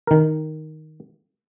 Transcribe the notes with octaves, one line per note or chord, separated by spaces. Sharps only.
D#3 A#4